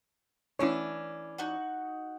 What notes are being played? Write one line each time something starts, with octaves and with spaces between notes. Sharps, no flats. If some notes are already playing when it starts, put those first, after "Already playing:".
E3 C#4 D4 E4 C#5
D#4 F#4 F#5